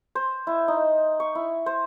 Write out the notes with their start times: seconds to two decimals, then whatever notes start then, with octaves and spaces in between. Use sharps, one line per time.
0.15 C5
0.47 E4
0.68 D#4
1.20 C#6
1.35 E4
1.66 C5